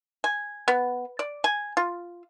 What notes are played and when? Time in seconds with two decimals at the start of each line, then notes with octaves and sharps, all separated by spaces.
0.24 G#5
0.68 B3
1.19 D5
1.44 G#5
1.77 F4